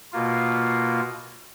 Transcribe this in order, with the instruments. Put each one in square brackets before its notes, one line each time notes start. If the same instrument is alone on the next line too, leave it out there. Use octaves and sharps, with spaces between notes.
[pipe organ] B2 A#3 F4